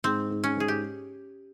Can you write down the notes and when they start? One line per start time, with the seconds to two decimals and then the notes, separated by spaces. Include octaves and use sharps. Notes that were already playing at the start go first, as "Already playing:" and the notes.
0.04 G#2 C4
0.31 G#2
0.44 C#4
0.57 G#2 G#4
0.68 G4